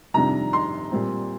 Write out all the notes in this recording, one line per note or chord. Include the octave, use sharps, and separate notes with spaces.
F2 C3 D#3 G3 D4 A#5
C6
A#2 G3 C4